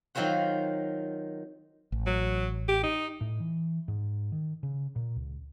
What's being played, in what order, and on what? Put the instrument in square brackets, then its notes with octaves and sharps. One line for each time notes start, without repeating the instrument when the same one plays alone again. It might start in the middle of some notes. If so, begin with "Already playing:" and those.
[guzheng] D#3 F#3 C4 F4 C5 F#5
[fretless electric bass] A1
[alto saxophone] F#3
G4
D#4
[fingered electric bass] A2
E3
G#2
D#3
C#3
A#2
C#2